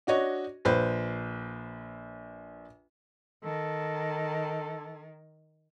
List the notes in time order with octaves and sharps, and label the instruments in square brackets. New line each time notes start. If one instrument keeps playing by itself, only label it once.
[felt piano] D4 F#4 C#5 D#5
A#1 B4 C5
[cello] D#3 [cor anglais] A4